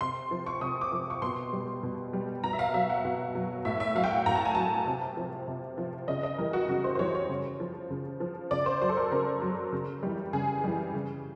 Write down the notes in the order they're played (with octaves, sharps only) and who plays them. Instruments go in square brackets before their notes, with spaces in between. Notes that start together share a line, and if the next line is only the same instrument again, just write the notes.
[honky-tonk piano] C3 C6
F3
C#6
C3 D#6
D6
F3
C#6
B2 C6
G3
B2
G3
B2 A#5
E5
F5
F#3 E5
F#5
B2
F#3
A2 E5
E5
F#3 F5
G5
F#5
A2 A#5
A5
G#5
F#3 A5
C3
F3
C3
F3
C#3 D#5
D#5
E3 G3 A#4
F#4
C#3 F#4
C5
C5
E3 G3 C#5
C#5
C#3
F3
C#3
F3
C#3 D5
C5
F#3 C5
A4
A#4
C#3 A#4
F#3
C#3
E3 G3
C#3 G#4
E3 G3
C#3